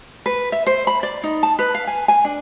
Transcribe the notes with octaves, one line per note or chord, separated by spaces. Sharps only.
B4
E5
C5
B5
D5
D#4
A5
B4
F5
G#5
G#5
D4